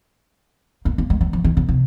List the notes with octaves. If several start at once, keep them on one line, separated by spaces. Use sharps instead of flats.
A#3
A#3
G#3
F#3
F3
D#3
C#3
C3